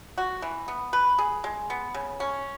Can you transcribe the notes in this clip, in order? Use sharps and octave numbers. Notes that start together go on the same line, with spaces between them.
F#4
E3
B3
B4
G#4
G#3
B3
C#3
C#4